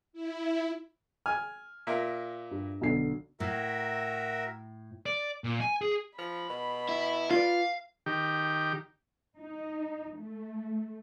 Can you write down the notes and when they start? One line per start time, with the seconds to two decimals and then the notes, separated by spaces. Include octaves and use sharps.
0.13 E4
1.26 G#5 F6 G#6
1.87 A#2 A#4 E5
2.51 G2
2.81 B1 D3 C7
3.40 A2 F#4 A#4 E5
5.06 D5
5.44 A#2
5.61 G#5
5.81 G#4
6.18 F3 B5
6.49 B2
6.89 E4
7.31 F4 B4 D5 F5
8.06 D#3 G4
9.38 D#4
10.18 A3